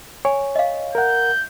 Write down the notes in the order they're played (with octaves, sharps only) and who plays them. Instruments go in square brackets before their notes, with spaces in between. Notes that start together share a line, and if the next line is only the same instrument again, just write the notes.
[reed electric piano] C#5 [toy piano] G#5
[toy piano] D#5 F5
[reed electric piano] A#4 F#5 [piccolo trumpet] G6